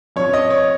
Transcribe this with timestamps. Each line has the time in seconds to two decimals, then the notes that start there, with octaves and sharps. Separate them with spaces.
0.16 F2 F3 C#5
0.33 D#5
0.50 C#5